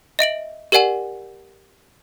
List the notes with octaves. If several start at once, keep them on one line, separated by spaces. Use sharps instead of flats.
D#5 E5 D7 F#7
G4 A#4 D5 F#5 G#5 F#7